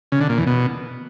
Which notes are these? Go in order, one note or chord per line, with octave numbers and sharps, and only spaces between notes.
C#3
D3
A#2
E2
B2